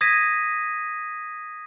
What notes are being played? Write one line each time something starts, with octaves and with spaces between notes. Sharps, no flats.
D#6 G#6 A#6 B6 D#7